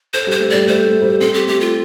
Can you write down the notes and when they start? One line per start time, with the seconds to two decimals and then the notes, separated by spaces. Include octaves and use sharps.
0.14 A4 C5
0.27 G3 C5
0.40 A3
0.50 G3 D5
0.67 A3 C5
0.85 A3
1.02 G3
1.21 C4 A4
1.34 G4
1.47 A3 G4
1.60 F4